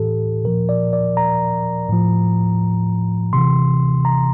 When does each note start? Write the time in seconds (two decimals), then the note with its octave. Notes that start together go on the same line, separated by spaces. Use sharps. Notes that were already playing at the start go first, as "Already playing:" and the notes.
Already playing: A2 E3 G4 A4
0.44 A#2 F3 A#4
0.69 D5
0.93 D5
1.17 A#5
1.89 A2 F3
3.33 C3 E3 C6
4.05 A#5